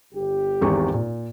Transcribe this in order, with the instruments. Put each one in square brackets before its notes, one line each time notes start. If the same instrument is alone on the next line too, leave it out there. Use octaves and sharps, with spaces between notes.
[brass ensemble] G1 G4
[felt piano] G#1 E2 C#6
A#2